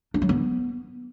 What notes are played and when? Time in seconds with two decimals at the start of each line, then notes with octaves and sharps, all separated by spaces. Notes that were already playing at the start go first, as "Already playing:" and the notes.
0.14 D4
0.22 F#3
0.29 B3